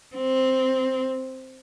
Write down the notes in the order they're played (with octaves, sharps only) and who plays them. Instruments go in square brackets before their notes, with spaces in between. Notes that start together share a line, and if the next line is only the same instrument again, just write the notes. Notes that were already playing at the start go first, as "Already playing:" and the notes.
[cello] C4